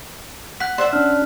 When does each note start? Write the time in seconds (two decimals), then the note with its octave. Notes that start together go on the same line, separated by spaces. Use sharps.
0.60 F#5 F#6 B6
0.78 C5 D5 E5 F#5
0.93 C#4 D4 F6